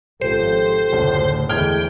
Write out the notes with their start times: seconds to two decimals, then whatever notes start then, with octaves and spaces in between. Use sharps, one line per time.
0.21 G#1 C#3 F3 F4 G4 A4 C5
0.93 F#1 D2 A2
1.49 E2 A2 D3 E3 G#3 G5 F6 G#6